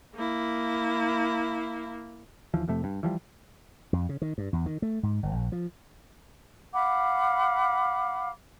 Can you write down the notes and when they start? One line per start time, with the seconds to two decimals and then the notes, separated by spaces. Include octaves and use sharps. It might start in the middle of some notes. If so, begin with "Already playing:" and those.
0.15 A#3 E4
2.54 D#2 E3 F3
2.68 F2 C3 A3
2.84 G2
3.03 E3 F3 G3
3.93 F2
4.09 C#3
4.22 D#3
4.38 G2
4.53 E2
4.66 D#3
4.82 A3
5.03 G#2
5.23 G1
5.34 A#1
5.52 F3
6.73 F5 F#5 B5 D6